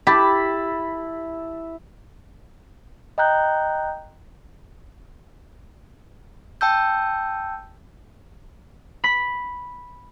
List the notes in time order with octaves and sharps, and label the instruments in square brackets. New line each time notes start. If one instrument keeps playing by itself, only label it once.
[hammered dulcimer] E4 A5 B5 [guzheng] G4
[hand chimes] D#5 G5 A#5 F#6 G6
G5 A5 E6 G6
[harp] B5 B6